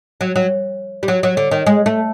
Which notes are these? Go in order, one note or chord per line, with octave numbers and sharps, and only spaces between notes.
F#3
F#3
G3
F#3
F#3
D3
D#3
G#3
A3